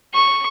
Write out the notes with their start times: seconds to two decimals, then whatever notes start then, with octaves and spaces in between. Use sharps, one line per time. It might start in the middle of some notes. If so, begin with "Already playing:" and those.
0.14 C#6